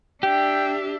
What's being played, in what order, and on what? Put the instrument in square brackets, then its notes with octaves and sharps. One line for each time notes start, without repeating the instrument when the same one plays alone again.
[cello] D4 E5 [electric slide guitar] G4 [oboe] G5